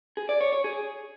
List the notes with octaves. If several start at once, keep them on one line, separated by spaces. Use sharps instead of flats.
G#4
D5
C#5
C#5
G#4